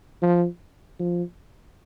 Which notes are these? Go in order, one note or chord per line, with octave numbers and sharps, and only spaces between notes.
F3
F3